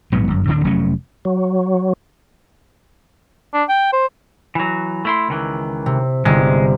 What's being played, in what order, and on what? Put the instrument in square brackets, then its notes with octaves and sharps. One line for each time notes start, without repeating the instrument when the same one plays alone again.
[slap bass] A#1 G#2 F#3 B3
G1 F#2
D1 D3 C#4 D4
F1 F#3 A3 C#4
[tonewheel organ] F#3
[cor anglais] D4
G5
C5
[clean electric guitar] E3 F#3
A3 E4 C6
C#2 D#3 E3
[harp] C3
[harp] G1 C3 [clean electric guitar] G#3